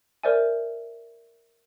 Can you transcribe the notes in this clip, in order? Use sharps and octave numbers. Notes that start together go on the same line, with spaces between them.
A#4 C5 D5 E5 G#5